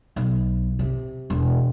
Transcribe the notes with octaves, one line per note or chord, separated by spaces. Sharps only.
B1
C3
E1